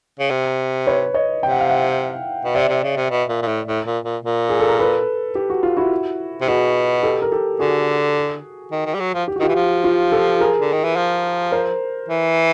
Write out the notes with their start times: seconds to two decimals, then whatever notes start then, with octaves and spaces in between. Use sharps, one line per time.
0.19 C#3
0.30 C3
0.87 B4 C#5
1.14 C#5 D#5
1.42 C3 G5
1.51 F#5
1.60 F5
1.69 E5 F#5
2.45 B2
2.55 C3 D5 E5
2.69 C3
2.83 C#3
2.97 C3
3.10 B2
3.29 A#2
3.42 A#2
3.48 A2
3.67 A2
3.86 A#2
4.04 A#2
4.23 A#2
4.49 G#4
4.60 A4
4.69 A#4
4.80 A4 B4
5.35 G4
5.50 F#4
5.63 F4
5.77 E4 F#4
6.41 C3
6.48 B2 F#4 G#4
7.03 G4 A4
7.22 A#4
7.31 G4 A4
7.59 D3 F#4 G#4
8.72 D#3
8.86 D#3
8.94 G3
9.00 F#3
9.14 F3
9.28 G4
9.36 F#4
9.40 D#3 F4 G4
9.49 E3
9.55 F3
9.84 F4 G4
10.12 G4 A4
10.41 G#4 A#4
10.61 D3
10.73 D#3
10.84 E3
10.96 F3
11.52 A#4 C5
12.08 E3